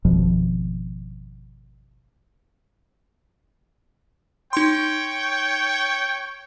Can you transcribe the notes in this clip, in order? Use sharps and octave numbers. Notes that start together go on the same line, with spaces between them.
G#1 F2 B2 F3
D#4 C#5 G5 C6 C#6